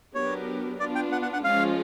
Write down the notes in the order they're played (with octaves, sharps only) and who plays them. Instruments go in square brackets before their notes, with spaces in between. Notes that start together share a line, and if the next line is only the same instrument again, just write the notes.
[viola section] F#3 B3 D4 G4 A#4 [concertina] C#5
[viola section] B3 D4 F4 [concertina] D5
[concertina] G5
F#5
F#5
F#5
[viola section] F3 G#3 C#4 F4 [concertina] F5